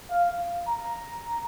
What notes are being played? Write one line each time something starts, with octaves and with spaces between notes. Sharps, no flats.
F5
A#5